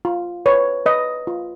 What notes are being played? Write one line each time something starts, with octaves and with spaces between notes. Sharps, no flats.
F4
B4 C#5
B4 D#5
F4